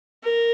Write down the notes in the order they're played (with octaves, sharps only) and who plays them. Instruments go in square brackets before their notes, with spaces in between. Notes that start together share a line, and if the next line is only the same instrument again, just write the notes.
[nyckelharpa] A#4